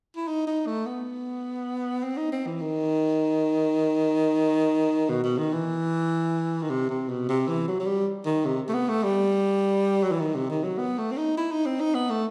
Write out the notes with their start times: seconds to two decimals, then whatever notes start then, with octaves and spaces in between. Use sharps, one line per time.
0.16 E4
0.28 D#4
0.47 D#4
0.67 A3
0.86 B3
2.03 C4
2.17 D#4
2.32 C4
2.46 E3
2.61 D#3
5.09 B2
5.24 B2
5.38 D#3
5.53 E3
6.62 D#3
6.70 C3
6.89 C3
7.09 B2
7.29 C3
7.48 E3
7.68 F#3
7.80 F#3
7.86 G3
8.25 D#3
8.45 C3
8.69 A3
8.74 B3
8.89 A3
9.03 G3
10.03 F#3
10.12 E3
10.20 D#3
10.35 C3
10.50 D#3
10.64 F#3
10.78 B3
10.98 A3
11.11 C4
11.17 D#4
11.37 E4
11.52 D#4
11.66 C4
11.80 D#4
11.95 B3
12.10 A3